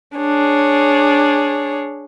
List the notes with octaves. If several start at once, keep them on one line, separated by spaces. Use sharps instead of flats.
D4 G#4 C#5